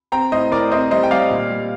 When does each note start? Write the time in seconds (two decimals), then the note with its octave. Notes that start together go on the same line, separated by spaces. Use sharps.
0.12 C4 G5 A#5
0.32 A2 C5 D#5
0.52 A2 A#4 D5
0.71 C4 C5 D#5
0.91 G3 C5 D#5
1.03 G5
1.11 G3 D5 F5
1.31 A#2
1.51 G3